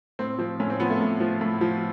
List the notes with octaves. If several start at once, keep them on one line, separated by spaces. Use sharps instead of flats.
A2 C4
F3 C4
A2 C#4
C4
F3 B3
A3
A2
F3
A2
F3